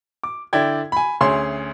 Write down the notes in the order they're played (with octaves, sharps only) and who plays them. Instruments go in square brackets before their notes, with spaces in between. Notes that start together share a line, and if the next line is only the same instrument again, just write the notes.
[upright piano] D6
D3 E4 D5 G5 G#6
G#5 B5
D2 C#4 G#4 E5 C6 C7